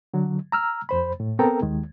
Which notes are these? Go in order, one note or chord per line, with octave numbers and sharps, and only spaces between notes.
D3 F#3
A#5 E6 F6
F2 C5 B5
A2
B3 C4 A4 A#4 G5 A#5
D#2 D#3 G#3